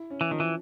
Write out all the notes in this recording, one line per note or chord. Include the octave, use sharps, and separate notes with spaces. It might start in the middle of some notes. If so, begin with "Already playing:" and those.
Already playing: E4
C#4
E3
D#3 F3
E3